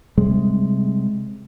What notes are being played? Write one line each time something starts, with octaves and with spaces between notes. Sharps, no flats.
C3 G3 G#3